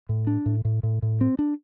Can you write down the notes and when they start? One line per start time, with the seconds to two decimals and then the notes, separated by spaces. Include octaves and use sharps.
0.09 A2
0.27 D4
0.46 A2
0.65 A2
0.83 A2
1.02 A2
1.21 C4
1.39 D4